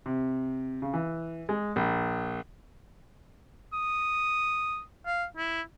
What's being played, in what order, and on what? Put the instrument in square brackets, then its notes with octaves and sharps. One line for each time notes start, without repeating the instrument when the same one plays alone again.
[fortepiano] C3
C#3
E3
G#3
A#1
[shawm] D#6
F5
E4